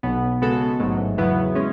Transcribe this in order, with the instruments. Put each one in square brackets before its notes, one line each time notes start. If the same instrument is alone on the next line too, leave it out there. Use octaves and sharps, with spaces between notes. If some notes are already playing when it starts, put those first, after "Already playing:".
[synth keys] B1 B2 F#3 B3
C#3 G#3 B3 F#4 A4
A1 G#2 F#3 A3
E2 C#3 F#3 B3 E4
G#3 C#4